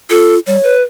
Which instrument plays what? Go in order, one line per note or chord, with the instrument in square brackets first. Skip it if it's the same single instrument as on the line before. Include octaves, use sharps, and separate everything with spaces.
[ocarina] F4 [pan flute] A4
[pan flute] G3 [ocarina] C#5
[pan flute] B4